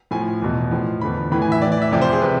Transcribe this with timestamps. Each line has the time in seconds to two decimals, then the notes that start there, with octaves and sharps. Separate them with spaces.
0.11 A2 F3 G#5
0.42 E2 B2
0.71 A2 F3
1.01 E2 D3 F3 B5
1.32 A2 E3 B5
1.42 G#5
1.52 E5
1.62 A2 E3 D5
1.72 D5
1.82 E5
1.91 F2 C3 F3 D5
2.02 C5
2.13 G#4
2.22 C3 B4